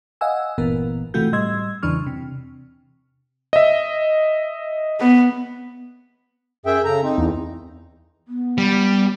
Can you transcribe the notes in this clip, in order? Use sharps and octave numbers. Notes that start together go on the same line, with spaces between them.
D#5 F5 F#5 G#5 E6
G1 A#2 E3 B3 A#4
C3 E3 A3 F4 F#4 G6
A2 G3 D#5 C6 E6 G#6
E2 C#3 E3 D4 C#6 F6
C3
D#5 E5
B3
F#2 G#4 E5 G5
C#3 A4 A#5
C4 D#4
E2
B3
G3